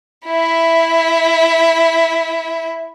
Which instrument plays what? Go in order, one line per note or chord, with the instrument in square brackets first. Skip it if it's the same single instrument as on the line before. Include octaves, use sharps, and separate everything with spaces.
[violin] E4 E5